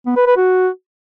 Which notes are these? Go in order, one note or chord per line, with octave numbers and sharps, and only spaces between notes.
B3
B4
B4
F#4